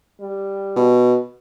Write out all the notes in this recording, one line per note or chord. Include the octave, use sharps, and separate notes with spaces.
G3
B2